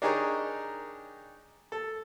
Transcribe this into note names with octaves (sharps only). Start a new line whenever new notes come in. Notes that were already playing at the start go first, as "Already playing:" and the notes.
D4 D#4 G4 G#4 A#4 C#5
A4